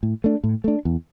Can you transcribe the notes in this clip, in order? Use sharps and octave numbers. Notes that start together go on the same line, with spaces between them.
A2
A3 D4
A2
A3 D4
E2